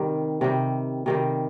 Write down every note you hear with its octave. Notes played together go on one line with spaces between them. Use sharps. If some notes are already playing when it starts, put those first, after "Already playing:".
Already playing: C3 D#3 G3
C3 D#3 G3
C3 D#3 G3